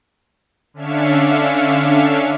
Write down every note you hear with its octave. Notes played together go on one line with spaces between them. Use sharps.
D3 C#4 D4 E5 F5 C#7